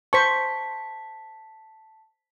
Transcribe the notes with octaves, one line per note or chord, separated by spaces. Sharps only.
C5 A5 C#6 B6